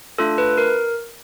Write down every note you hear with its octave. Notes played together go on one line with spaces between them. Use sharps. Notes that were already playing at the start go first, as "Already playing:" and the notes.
A3 D4 F4 A4
B4
A#4